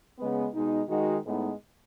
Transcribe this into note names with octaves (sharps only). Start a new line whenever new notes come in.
C#3 G#3 B3
B2 G#3 D#4
D#3 G#3 D#4 F#4
A2 G#3 B3 D#4